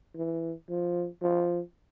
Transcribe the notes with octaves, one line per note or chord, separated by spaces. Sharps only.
E3
F3
F3